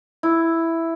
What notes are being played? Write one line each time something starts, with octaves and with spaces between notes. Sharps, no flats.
E4